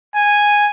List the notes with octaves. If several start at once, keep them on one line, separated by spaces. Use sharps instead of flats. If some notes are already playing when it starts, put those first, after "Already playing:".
G#5